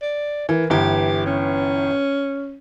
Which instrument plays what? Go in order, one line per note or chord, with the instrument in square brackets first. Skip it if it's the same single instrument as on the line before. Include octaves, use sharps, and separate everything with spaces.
[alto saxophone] D5
[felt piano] E3 [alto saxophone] A#4
[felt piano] G1 E3 G5 [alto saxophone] G4
[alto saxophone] C#4